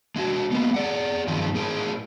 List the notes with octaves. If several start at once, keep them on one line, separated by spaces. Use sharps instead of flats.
G#3 D4 F#4
G#3 A#3 B3
G#4 D5 F#5
G2 D#3 F3 G#3 C4 D#4
A2 G#4 A#4 C5